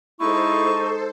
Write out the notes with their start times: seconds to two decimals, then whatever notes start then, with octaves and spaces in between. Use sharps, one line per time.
0.20 G#3 D#4 E4 A4 C5 C#6